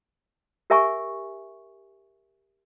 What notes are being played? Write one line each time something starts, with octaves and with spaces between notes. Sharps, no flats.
G4 A#4 E5 G#5 C#6